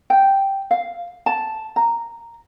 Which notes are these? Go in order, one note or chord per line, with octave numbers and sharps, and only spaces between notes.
G5
F5
A5
A#5